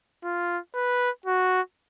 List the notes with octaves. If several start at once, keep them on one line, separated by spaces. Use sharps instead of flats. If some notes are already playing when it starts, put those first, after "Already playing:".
F4
B4
F#4